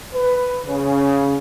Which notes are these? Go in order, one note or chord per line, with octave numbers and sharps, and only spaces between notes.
B4
C#3